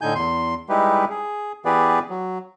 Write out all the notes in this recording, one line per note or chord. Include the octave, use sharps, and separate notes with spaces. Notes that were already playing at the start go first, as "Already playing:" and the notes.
A2 D3 D#4 G#5 G6
E2 C6
G3 G#3 D#4 E4 G4 B4
G#4
E3 B3 G4 G#4 B4 D5
F#3